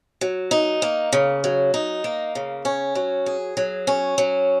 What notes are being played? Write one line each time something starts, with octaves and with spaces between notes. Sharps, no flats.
F#3
D#4
A#3
C#3
F#3
D#4
A#3
C#3
C#4
F#3
G#4
F#3
C#4
F#3